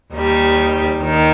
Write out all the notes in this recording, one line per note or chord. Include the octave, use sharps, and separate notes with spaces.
D#2 D#3 G3
D#2 D#3